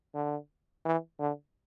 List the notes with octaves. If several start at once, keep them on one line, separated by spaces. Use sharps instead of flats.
D3
E3
D3